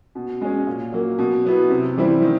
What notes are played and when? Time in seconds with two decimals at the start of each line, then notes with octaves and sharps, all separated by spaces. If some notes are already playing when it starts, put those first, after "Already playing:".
0.15 B2
0.41 G#3 C#4
0.67 A#2
0.92 F#3 A#3
1.19 B2
1.45 F#3 B3 E4
1.70 C3
1.96 E3 G3 C4 E4
2.22 D#3